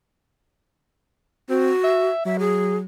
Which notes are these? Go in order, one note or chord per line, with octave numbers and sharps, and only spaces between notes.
C4 F#4
E5
F#3 E5
G#4